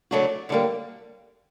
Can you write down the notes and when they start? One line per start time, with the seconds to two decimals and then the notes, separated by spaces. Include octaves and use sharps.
0.11 C#3 F#3 A3 D4 F#4
0.49 F#2 D3 G3 A#3